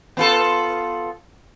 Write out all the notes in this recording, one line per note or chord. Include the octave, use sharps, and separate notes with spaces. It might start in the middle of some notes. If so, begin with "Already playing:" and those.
B3 F4 A4